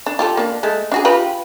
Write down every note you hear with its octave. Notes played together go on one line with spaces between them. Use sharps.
D4
F4 G4 A4
A#3 D4
G#3 A3
D4 F#4 G#4
F4 G4 B4